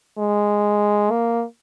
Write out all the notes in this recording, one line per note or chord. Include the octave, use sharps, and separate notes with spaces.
G#3
A#3